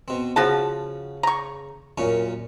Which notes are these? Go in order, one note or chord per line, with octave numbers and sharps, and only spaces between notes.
B2 C4
C#3 F3 F#4 A5
A#5 C#6
F#2 A#2 C#4